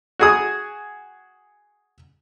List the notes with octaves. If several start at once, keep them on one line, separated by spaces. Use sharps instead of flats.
F#4 G#4 D#6